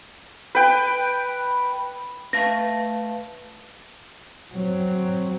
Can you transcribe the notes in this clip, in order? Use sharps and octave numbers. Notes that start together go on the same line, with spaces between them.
B4 G5
A3 B4 F5 A5 A#6
F#3 C4